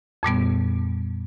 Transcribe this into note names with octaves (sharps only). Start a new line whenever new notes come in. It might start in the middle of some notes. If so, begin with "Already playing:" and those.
F2 A#2 G3 B3